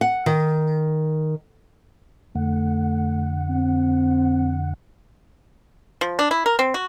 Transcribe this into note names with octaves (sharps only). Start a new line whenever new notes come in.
F#5
D#3
F2 D3 A3 F#5
C4
F3
D4
E4
A#4
C4
F#4